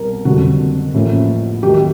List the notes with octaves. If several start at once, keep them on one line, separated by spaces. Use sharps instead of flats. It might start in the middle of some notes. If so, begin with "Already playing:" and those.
Already playing: C2 B2 G3 A#4
F#1 F2 D3 G3 F#4
A1 A2 F3 A#3 C#4
D#2 D#3 F#3 G4
G4